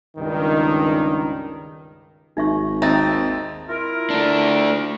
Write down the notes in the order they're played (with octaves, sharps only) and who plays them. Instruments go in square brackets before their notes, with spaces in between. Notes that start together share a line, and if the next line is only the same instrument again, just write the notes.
[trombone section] C#2 G2 D#3
[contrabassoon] G#1 [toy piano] D#4 E5 C#6
[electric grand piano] D#2 C4 A6 [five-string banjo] D#4 [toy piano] E5
[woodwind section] E4 F4 A#4
[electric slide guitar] A3 D4